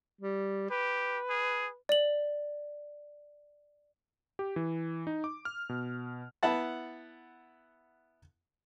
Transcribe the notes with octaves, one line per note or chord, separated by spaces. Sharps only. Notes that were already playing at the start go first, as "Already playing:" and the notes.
G3
G4 B4
G#4
D5 F#7
G4
E3
D#4
D6
F6
B2
B3 E4 F#5 A5